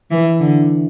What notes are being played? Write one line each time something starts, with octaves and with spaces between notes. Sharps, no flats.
E3
D3